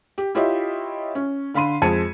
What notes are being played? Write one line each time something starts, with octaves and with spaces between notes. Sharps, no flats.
G4
E4 F4 G4 C#5 D#5 E5
C#4
D3 F5 B5 C6 D#7
F2 G#3 A5 G#6 C#7 D#7